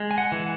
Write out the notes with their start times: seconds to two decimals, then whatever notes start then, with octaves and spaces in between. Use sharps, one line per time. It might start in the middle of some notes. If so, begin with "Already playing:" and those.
Already playing: G#3
0.11 G#5
0.18 F#5
0.32 E3